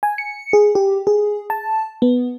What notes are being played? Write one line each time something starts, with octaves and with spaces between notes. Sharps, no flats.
G#5
C#7
G#4
G4
G#4
A5
B3